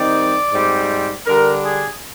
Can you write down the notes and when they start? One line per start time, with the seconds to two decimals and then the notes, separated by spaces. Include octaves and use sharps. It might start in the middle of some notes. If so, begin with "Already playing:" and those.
Already playing: D#3 G3 C4 D#4 D5
0.51 G#2 G3 C4
1.26 D3 G3 D4 A#4
1.64 G#4